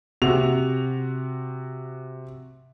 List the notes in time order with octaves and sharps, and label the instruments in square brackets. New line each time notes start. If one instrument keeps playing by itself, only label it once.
[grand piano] C3 F#4 F7